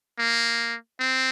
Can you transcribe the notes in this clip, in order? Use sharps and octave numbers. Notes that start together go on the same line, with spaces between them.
A#3
C4